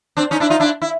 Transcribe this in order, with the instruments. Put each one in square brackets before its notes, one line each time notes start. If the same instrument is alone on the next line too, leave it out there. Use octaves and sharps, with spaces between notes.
[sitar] C4 D4
C#4 D#4
D4 E4
D#4 F4
D4 E4
E4